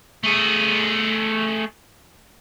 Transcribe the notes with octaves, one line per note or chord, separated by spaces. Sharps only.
A3 G#4